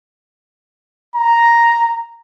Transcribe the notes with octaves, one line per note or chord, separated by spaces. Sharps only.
A#5